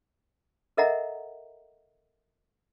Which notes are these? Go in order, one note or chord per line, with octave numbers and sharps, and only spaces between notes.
A4 A#4 D#5 E5 F#5 A#5